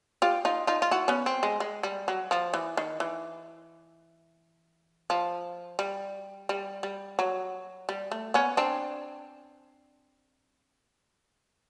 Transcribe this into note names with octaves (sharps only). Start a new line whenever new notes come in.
F4 G4
D#4 F4
D#4 F4
F4
E4 F#4
B3 C#4
C4
G#3
G#3
G3
F#3
F3
E3
D#3
E3
F3
G3
G3
G3
F#3
G3
A3
B3 C#4
C4 D4